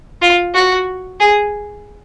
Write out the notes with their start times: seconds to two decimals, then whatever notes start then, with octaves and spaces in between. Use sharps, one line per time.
0.22 F4
0.54 F#4
1.20 G#4